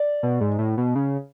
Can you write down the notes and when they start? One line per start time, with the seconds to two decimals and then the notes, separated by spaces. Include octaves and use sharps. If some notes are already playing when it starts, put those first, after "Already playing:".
Already playing: D5
0.23 B2
0.41 G#2
0.59 A2
0.78 B2
0.95 C#3